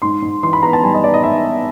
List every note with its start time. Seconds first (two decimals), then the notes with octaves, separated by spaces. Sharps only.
0.02 G#2 C6
0.22 G#2
0.43 E3 C6
0.53 B5
0.63 B3 A#5
0.73 A5
0.83 G3 G#5
0.94 D#5
1.03 B3 D5
1.14 D#5
1.23 G#2 E5
1.45 B3